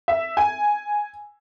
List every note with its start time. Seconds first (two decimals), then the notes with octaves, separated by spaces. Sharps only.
0.08 E5
0.37 G#5